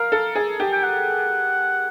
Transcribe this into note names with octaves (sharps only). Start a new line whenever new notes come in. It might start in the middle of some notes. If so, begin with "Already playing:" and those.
Already playing: A#4 F5
A4
G#4
G4
G5
F#5